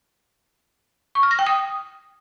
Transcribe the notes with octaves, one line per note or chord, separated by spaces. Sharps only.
C#6
F6
A#6
G5
D#6